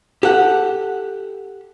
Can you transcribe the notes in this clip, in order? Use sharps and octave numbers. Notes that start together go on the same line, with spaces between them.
G4 A4 F#5